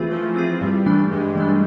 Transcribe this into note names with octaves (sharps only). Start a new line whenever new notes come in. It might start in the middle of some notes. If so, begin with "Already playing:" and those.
Already playing: E3 A3 C4 F4 G#4
F3 A3
C4 F4 G#4
G2 G3
E3 A3 D4
G2 G#3
E3 A3 D4